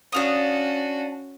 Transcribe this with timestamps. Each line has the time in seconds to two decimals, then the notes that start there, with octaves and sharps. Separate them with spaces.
0.12 C#4 D4 F#4 F5 D#6